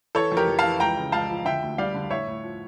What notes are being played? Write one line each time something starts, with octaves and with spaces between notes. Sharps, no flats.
E3 A4 C#5
F2
G4 A#4
F2
F5 A5
E3
C#2 G5 A#5
C#3
C#2 F5 A5
F3
D3 E5 G5
D2
G3 D5 F5
D3
A2 C#5 E5
A2
F3